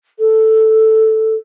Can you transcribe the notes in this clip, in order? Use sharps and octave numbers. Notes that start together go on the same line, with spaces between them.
A4